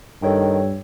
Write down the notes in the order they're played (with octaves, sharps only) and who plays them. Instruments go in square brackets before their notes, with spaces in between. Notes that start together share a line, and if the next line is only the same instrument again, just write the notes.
[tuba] G2 [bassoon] D#3 [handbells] A4 C#5 G5